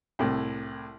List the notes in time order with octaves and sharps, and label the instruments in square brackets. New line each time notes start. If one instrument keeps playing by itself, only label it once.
[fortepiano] C2 A2